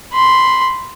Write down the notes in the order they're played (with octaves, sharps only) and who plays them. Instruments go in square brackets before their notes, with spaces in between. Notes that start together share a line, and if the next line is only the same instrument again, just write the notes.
[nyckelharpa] B5 C6